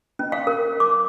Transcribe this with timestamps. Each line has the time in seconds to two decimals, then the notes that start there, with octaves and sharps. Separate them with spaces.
0.19 C#4
0.32 F5
0.47 A#4
0.80 D6